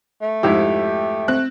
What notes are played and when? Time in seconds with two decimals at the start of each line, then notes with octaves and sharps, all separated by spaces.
0.22 A3
0.43 F2 G#2 E4 G4
1.28 C4 F#6